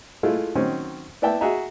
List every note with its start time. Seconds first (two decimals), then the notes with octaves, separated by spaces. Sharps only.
0.23 G#3 A3 E4 F4
0.55 D#3 F#3 C4 C#4
1.22 B3 E4 D5 E5 G5 A5
1.41 F#4 G#4 D#5 E5 A#5